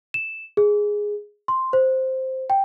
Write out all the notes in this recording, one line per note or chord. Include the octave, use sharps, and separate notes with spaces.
E7
G#4
C6
C5
G5